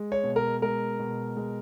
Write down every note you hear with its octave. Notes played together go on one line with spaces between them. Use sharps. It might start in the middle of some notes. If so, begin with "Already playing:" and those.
Already playing: G#3
C#5
B2
A#4
G#3 A#4
B2
G#3